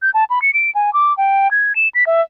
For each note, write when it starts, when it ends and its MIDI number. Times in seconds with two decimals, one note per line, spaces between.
0.02 0.10 91
0.14 0.24 81
0.30 0.42 83
0.42 0.51 97
0.54 0.71 98
0.75 0.93 80
0.93 1.15 86
1.17 1.51 79
1.51 1.75 92
1.76 1.88 100
1.95 2.04 95
2.07 2.21 76